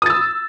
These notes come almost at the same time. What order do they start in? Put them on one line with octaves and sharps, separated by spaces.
D#6 A6 E6